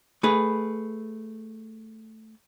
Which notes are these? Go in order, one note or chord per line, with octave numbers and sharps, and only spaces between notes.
A3 G#4 B4